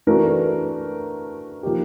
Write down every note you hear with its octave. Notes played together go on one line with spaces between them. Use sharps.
E3 A3 D4 F#4 A#4
F3 A#3 D#4 G4